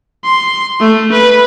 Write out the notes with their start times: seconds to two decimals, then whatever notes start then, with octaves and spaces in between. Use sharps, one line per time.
0.25 C6
0.81 A3
1.12 B4